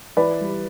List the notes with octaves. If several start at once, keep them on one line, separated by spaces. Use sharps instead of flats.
E3 B4 D5
G3